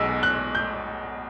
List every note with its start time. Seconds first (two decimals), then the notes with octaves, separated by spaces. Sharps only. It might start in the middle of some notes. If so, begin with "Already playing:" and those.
Already playing: B1 B2 G#3 E6
0.23 F#6
0.55 G6